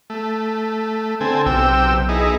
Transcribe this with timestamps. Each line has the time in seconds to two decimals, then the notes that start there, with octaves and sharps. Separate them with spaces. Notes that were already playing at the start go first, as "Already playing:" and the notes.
0.10 A3
1.21 D3 C4 A4 G#5
1.46 B1 C3 G5 E6
2.09 D#4 E4 G#4